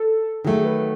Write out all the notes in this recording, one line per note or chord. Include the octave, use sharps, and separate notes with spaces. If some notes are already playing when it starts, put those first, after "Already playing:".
Already playing: A4
D#3 F#3 A3 G#4
B4